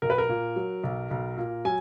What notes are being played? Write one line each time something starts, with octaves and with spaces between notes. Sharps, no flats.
B1 A#4
B4
A#4
A#2
F#3
B1
B1
A#2
F#3 G#5